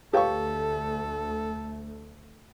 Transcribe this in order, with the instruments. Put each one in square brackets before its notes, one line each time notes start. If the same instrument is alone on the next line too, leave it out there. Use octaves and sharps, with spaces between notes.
[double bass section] D2 A3 [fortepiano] G4 C#6 [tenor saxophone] A4 [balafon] B4 C#5 F5